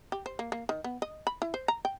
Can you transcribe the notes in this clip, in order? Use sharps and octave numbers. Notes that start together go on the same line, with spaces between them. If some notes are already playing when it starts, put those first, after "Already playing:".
G4
C5
A#3
A#3
D#3
B3
D#5
B5
E4
C5
A#5
G5